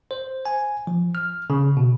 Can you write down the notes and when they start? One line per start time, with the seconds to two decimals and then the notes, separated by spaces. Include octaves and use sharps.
0.11 C5
0.45 G#5
0.87 F3
1.15 F6
1.50 C#3
1.77 B2